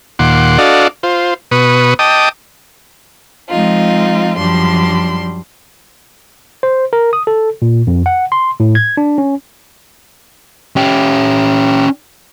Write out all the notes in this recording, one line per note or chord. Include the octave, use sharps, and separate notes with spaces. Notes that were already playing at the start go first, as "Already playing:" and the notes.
D#2 A#2 F#5 C6 D6
D4 F#4 A4 D5 D#5 F5
F4 C5
B2 B4 C#6 D#6
D#5 G5 A5 D6 D#6
F3 G#3 C4 D#4 F4
F#2 F3 G3 D4 C6
C5
A#4
D#6
A4
A#2
F2
F#5
C6
A2
G#6
D4
C#4
C#4 G4